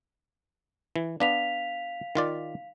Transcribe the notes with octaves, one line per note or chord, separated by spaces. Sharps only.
E3
B3 D4 F5 B6 F7
D#3 F4 D5